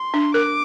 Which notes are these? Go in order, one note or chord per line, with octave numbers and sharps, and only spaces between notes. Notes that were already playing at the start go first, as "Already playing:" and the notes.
Already playing: C6
D4
A#4 D6